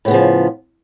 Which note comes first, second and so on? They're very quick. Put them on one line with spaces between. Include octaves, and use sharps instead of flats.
A2 B3 C#3 F3